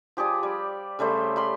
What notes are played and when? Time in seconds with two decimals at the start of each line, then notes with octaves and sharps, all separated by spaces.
0.17 F3 G4 G#4 D5
0.43 G3
0.99 C#3 G3 A3 C5
1.36 G3 B5 C6